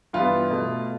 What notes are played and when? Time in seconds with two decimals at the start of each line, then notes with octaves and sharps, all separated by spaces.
0.13 G2 E3 B3 F4
0.50 B2 A3